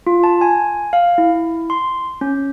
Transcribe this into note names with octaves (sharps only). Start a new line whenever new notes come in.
F4
A5
G#5
F5
E4
C6
C#4